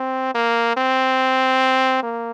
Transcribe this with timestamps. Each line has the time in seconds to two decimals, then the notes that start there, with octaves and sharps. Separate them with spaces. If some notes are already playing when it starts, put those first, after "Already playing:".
Already playing: C4
0.35 A#3
0.77 C4
2.03 A#3